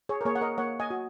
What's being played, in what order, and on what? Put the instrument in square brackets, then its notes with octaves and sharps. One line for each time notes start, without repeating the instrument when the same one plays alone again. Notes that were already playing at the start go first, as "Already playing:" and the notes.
[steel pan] G#4 C#5
A#4
A#3 G#4 C#5
F#5
A#4 D#5
A#3 C#5 F#5
D#5 G#5
F#4